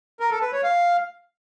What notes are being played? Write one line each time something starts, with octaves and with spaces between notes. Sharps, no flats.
A#4
A4
B4
C#5
F5